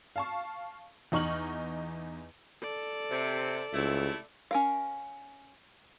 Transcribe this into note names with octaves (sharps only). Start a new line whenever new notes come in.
F5 A5 C#6
E2 D#4 C#6 F6 F#7
A4 D5
C3
C#2 C3 A3 E4
C#4 A#4 F5